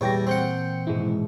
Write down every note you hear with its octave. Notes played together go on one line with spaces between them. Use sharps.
E2 A#2 E3 G3 C#5 G5 A#6
C4 A4 C#5 F#5 G5 G6 C#7
D#1 G#2 B2 G#3 E4